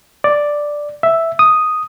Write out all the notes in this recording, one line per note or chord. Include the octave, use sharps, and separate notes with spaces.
D5
E5
D#6